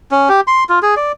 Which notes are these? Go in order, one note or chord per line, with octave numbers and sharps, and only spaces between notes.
C#4
G4
C6
F4
G#4
D5